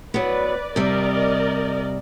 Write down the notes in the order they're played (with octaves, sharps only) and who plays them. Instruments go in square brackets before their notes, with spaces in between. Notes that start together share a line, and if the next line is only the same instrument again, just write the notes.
[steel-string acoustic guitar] F#3 B3 [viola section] B4 D5
[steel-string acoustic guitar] C3 G3 [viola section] A#4 D5 D#5